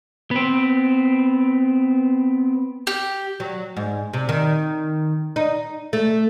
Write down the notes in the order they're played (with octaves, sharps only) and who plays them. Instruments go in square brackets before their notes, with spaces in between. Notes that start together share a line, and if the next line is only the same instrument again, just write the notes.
[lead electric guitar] B3 C4
[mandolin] G4
[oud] F#3
G#2
C3
D#3
D#4
A3